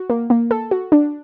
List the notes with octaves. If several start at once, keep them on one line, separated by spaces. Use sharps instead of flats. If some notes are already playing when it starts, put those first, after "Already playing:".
Already playing: F#4
A#3
A#3
A4
F#4
D4